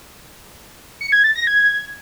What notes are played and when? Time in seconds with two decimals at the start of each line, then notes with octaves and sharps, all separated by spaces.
1.01 C#7
1.12 G#6
1.24 A6
1.36 A#6
1.47 G#6